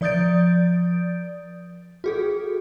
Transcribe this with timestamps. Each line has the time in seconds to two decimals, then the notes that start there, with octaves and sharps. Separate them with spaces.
0.01 F3 D5 D#6 G6 A6 D7
2.04 F#4 G#4 A4